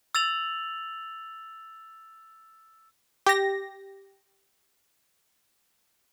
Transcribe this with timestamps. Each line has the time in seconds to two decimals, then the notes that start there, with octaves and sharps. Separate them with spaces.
0.15 E6 A6 F7 F#7
3.26 G4 A#6